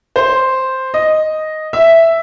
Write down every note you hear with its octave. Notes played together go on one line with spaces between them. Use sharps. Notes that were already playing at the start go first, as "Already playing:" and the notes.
C5
D#5
E5